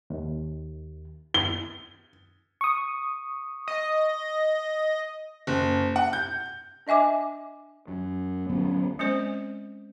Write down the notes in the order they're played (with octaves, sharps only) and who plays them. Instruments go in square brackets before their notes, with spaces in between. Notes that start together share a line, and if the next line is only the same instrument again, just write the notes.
[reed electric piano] D#2
[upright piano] G7
[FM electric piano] C#6 D#6
[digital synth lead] D#5
[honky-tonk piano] F#1
F#5
G6
[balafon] D4 D#5 E5 G#5 D6
[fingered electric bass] F#2
D1 F#3 B3 C#4
[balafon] G#3 C4 C#4 C5 D5